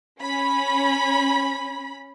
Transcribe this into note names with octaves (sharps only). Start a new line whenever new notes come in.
C#4 B5